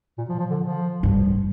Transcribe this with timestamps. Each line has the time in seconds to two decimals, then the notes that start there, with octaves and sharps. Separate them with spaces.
0.18 A#2
0.29 F3
0.40 F3
0.51 D3
0.61 F3
1.03 G2